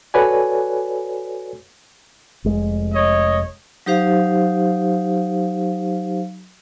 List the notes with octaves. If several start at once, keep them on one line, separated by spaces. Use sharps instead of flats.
F#4 A4 B4 C#5 D5 G#5
F1 G#3
C#5 D#5
F#3 D#4 G4 C5 F5